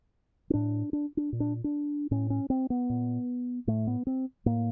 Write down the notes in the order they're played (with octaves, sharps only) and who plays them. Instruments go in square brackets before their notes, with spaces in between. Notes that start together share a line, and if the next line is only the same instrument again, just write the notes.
[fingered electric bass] C#4
A2 D4
D4
D4
A#2
D4
D4
A2 C#4
C#4
C4
B3
A#2
A2 A3
B3
C4
A2 A#3